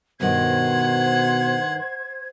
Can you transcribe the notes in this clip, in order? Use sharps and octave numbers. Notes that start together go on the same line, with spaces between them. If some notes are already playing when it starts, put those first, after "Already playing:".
G2 B2 D#3 C5 F#5 G#6